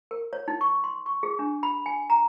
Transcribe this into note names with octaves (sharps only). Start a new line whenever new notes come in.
A#4
C#5
D#4
C#6
C6
C#6
G#4
D4
B5
G#5
A#5